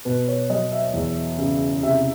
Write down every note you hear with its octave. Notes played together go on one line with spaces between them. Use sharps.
B2 B4
C#5
F#3 D#5
E5
E2
C#3
C3 E5